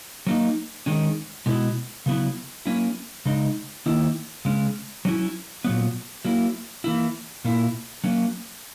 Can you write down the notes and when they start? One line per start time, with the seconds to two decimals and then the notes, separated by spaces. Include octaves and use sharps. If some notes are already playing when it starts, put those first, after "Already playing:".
0.27 F#3 A#3 D#4
0.86 D#3 G#3 C#4
1.46 B2 G#3 B3 E4
2.06 C#3 F#3 B3 E4
2.66 F#3 A#3 C#4 E4
3.26 C#3 G#3 D#4
3.86 D#3 A#3 E4
4.45 C#3 G#3 C#4
5.05 F#3 C#4 E4
5.65 A#2 F#3 B3
6.25 F#3 A#3 E4
6.84 E3 A#3 E4
7.45 A#2 A#3 E4
8.04 F#3 A#3 C#4